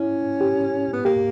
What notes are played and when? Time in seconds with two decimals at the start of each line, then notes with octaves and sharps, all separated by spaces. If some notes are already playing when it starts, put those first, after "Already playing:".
Already playing: C#4 E4
0.41 G4
0.93 B3
1.05 A#3 G4